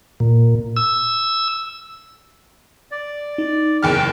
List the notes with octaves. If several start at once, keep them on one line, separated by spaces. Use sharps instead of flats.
A#2
E6
D5
D#4
F#1 E2 G5 F6